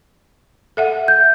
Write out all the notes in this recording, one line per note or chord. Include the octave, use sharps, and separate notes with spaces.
A4 E5 F#5
G6